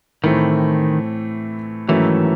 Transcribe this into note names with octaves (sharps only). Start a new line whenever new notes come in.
A2 D#3 E3 A3 C4
G#2 D#3 E3 F#3 A3 C#4